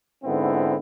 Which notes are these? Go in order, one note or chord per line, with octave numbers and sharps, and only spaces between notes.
G#2 D3 B3 C4 E4